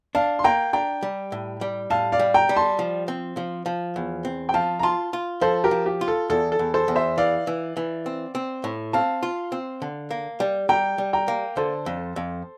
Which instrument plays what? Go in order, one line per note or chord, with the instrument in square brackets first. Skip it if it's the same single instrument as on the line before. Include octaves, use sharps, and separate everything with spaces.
[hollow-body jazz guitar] D4 [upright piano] F5 A5
[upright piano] C6
[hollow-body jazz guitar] A#3 [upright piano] G5 A#5
[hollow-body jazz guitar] D4 [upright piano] G5 A#5
[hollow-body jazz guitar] G3
A2
G3
[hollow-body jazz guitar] A2 [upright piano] F5 A5
[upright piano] D5 F5
[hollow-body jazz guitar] G3
[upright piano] G5 A#5
[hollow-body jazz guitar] G3
[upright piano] A5 C6
[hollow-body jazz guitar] F3
C4
F3
F3
E2
C4
[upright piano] G5
[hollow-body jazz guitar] F3 [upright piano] F5 A5
[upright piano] A#5
[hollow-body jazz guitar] F4 [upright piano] A5 C6
[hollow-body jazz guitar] F4
[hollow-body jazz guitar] F3 [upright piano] A4 C5
[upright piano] G4 A#4
[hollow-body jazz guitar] F3
[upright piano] G4
[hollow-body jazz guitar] F4
[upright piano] A4
[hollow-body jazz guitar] E2 [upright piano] A4
[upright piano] A4
[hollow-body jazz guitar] E2
[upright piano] A4 C5
[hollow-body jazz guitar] E2
[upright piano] C5 E5
[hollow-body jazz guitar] E3 [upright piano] D5 F5
[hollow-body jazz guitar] E3
E3
C4
C4
A2
[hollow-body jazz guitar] C4 [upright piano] F5 A5
[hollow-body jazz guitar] F4
C4
D3
A#3
G3
[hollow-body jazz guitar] G3 [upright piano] G5 A#5
[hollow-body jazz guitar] G3
[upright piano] G5 A#5
[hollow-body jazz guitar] A#3
[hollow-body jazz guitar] D3 [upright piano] A4 C5
[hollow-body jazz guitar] F2
F2